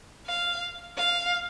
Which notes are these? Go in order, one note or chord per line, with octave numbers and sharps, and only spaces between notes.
F5
F5